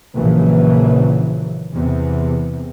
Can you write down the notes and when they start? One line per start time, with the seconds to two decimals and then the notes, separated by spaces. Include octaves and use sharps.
0.17 A#1 C#3 E3 F#3
1.74 E2 C3